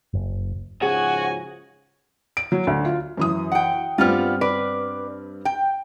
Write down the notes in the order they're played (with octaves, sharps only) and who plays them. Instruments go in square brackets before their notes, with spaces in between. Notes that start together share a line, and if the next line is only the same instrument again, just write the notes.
[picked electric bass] F#1
[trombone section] G#2 C#3 F3 [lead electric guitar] F#4 [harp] G#4 [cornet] G#5
[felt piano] D7
F#3
D2
F4
F#2 E3 D#6
[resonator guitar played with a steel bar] F#5 G5
[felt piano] G2 C4 F6 [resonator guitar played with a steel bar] G3 B3 F4
[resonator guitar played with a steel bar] B4 D5
G5